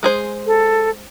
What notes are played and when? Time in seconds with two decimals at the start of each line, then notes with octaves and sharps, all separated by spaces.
0.03 G#3 G#4 C5
0.46 A4